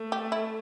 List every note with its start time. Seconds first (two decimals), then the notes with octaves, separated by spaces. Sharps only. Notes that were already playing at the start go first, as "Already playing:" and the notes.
Already playing: A3
0.12 G4
0.32 E4